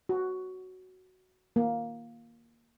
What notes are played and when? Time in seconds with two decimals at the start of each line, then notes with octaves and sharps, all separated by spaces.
0.09 F#4
1.56 A#3